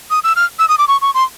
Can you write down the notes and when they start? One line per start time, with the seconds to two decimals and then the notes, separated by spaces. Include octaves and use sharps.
0.10 D#6
0.24 E6
0.36 F6
0.59 E6
0.69 D#6
0.78 D6
0.88 C#6
1.01 C#6
1.14 C6